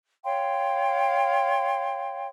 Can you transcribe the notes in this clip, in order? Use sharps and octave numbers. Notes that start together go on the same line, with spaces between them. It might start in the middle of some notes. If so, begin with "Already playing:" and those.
C#5 F5 G5 C6